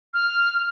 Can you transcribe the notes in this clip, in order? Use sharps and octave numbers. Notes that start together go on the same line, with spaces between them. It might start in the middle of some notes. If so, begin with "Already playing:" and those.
F6